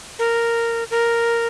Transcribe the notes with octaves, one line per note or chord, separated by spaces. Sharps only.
A#4
A#4